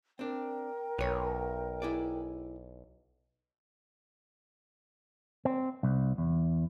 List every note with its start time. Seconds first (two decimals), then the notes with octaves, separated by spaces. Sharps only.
0.19 C4 D4 A#4 G5
0.98 B1 B4 C#5
1.82 E4 G#4 D5
5.45 C4
5.83 C2
6.18 E2